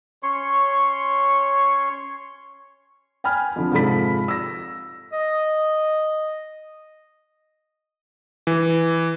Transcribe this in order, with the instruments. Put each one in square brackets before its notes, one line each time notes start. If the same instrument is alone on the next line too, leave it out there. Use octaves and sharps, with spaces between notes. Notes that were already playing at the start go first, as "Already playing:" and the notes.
[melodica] C#4 C#5 C6 C#6
[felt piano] G5 G#5 B5 F6
F2 D3 F3
G#2 C3 F3 A4 B5 B6
E6 A#6
[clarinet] D#5
[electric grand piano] E3